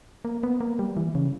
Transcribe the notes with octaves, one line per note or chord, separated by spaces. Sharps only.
A#3
B3
A#3
G3
E3
C#3